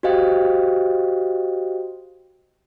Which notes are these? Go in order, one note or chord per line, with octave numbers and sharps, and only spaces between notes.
F#4 G4 C5 D#5 F5 G5